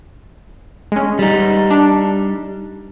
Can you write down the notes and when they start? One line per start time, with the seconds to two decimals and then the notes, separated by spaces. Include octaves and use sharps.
0.92 G#3 C#4
1.19 G3 D#4
1.70 D4